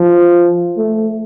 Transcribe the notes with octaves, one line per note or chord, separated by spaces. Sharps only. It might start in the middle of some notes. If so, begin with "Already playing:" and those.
Already playing: F3
A3